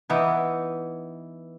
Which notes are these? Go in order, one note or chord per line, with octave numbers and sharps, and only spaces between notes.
E3 B3 D#4